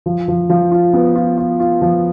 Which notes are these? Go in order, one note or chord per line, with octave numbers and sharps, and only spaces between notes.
F3
F3
F3
F4
B3
F4
F4
F4
F3